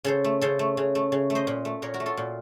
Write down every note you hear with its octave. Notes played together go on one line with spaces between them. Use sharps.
C#3 A4 C5
A3
C#3 A4 C5
A3
C#3
A3
C#3
A3
C5 D#5
A#2
A3
A#2 A#4 C#5
F#4 A#4
A3
F4 A4
A#2